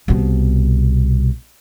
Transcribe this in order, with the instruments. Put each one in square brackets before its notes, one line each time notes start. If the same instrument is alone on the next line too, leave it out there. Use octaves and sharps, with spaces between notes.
[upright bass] C2 B2